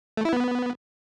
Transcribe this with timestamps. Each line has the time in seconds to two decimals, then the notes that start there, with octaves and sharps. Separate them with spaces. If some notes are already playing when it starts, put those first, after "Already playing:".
0.17 A3
0.25 E4
0.33 B3